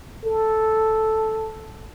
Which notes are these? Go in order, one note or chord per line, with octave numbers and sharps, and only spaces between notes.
A4